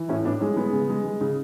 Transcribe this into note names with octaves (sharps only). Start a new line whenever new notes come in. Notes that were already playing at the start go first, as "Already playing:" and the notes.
Already playing: E3
A2 C#4 E4
A2 B3 D4
G#3 C#4
G#3 B3
C#3
G#3
G#3
C#3